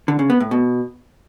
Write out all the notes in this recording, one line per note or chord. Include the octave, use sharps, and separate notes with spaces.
D3
C#3
B3
A2
B2